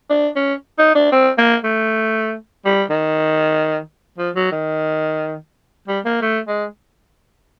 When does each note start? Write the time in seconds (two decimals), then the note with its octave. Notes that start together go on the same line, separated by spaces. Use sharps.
0.10 D4
0.36 C#4
0.78 D#4
0.95 D4
1.12 C4
1.38 A#3
1.64 A3
2.65 G3
2.90 D#3
4.18 F3
4.35 F#3
4.52 D#3
5.88 G3
6.05 A#3
6.22 A3
6.48 G#3